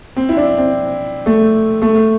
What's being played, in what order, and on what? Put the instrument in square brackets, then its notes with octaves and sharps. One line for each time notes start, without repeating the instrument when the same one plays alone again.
[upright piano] C4
E4
D4
C4
A3
A3